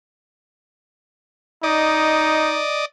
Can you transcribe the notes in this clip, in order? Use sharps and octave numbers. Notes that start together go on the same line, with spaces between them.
D#4 D5 D#5